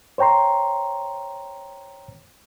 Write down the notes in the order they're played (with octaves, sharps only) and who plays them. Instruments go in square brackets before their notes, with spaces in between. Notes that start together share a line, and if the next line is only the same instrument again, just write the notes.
[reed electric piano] C5 C#5 G5 A#5 C6